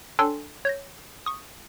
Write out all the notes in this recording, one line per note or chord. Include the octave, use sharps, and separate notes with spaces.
D4 A4 C#5 G5 G#5 C6
C#5 G6 A#6
C#6 D#6